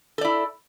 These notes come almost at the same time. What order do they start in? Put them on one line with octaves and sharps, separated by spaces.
A4 D5 E4